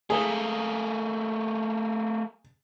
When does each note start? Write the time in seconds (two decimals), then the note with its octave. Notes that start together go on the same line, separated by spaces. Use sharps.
0.10 A3 A#3 G#4